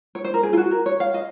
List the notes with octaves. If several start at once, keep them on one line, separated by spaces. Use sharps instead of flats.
C#5
C5
A#4
G#4
F4
F#4
A#4
C#5
F5
D#5